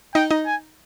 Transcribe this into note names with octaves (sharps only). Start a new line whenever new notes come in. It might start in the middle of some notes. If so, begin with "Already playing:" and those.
D#4 D#5 G5
D#4 D#5
G#5